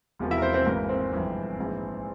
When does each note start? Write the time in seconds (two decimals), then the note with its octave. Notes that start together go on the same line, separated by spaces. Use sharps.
0.19 E1 E2 C3 F3 A#3
0.31 E4 E5
0.38 A#4
0.42 C4 C5
0.54 C4 C5
0.65 G#1 G#2 E3 A#3 A#4
0.89 C4 C5
1.12 G1 F2 C3 E3 G#3
1.59 A#1 G#2 E3